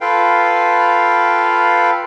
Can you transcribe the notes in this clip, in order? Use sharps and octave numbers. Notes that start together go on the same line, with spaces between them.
F4 A4 B4 F5 G5